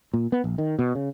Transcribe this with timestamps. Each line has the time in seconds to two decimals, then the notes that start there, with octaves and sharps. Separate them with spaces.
0.14 A#2
0.32 B3
0.44 A#1
0.58 D#3
0.79 B2
0.95 C#3